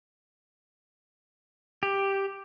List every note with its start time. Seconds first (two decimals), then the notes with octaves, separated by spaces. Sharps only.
1.83 G4